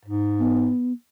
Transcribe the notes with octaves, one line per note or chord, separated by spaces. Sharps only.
G#2
B3